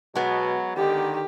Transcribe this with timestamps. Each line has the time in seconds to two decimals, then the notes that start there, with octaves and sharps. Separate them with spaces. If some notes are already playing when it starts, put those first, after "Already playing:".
0.15 B2 F#3 G#3 B3
0.77 D3 D#3 G4